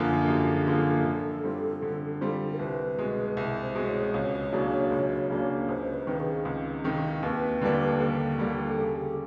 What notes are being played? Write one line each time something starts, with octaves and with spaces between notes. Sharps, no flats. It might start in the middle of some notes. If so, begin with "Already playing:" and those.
Already playing: F#2 D3 F3 A#3
F#2 G4
G#4
D3 F3 A#3
A4
D3
G3 C4 F4
D3
G3 C4 F4
A#4
C2 B4
B2 G#3
C2
C5
B2 G#3
C#5
C#2 C#5
C#3 F#3 A#3 D4
C#2
C#3 F#3 A#3 D4
C#2 C5
C5
B4
C3 D#3
G#4
C#2
C3 D#3
D#2 B4
D3 G3 A#3 D4
D#2 A4
D3 G3 A#3 D4
C#3 A4
G4